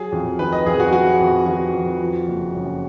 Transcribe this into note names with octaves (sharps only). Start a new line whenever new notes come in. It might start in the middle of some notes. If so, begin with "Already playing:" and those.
Already playing: F#3 G#4
F2
D#3 B4
D#5
F2 G#4
F#4
F#3 F#4
F2
D#3 F#4
F2
F3
F#1
F#2